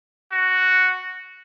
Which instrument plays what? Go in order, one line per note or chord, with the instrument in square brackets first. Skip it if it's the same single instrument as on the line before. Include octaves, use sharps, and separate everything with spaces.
[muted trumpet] F#4